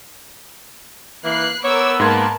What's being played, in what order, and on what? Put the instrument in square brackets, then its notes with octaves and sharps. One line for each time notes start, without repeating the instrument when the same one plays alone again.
[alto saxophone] E3 [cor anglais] A#3 [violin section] B4 F#6 C7
[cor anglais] B3 [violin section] A#4 D6 E6 [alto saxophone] C#5
[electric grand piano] G#2 C6 G#6 [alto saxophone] A#3 [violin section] A#4 B4 A5